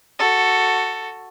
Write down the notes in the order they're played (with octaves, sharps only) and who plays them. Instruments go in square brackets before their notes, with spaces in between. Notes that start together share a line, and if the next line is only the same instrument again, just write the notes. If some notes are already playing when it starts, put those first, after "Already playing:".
[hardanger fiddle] F#4 A4